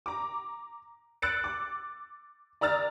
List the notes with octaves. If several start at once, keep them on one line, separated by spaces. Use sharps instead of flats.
A#5 D6
E6 F#6 A6 C#7 D7
D6
D5 A#5 E6 F6 A6